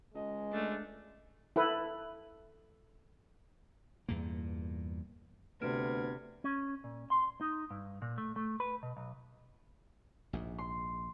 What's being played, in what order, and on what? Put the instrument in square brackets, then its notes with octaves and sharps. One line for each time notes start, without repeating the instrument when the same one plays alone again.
[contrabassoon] C#2 [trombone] G#3 [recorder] D#5
[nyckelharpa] A3 D4
[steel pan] E4 A4 B4
[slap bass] E2 G2 A#2 A#3
[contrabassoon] D2 [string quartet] C3 G#6 [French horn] B3 [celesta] B4 F6 D7
[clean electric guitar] C#4
A#2
C6
D#4
G2
A#2
A3
A3
B4
B2
B1
[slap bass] A#1 G#2
[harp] C6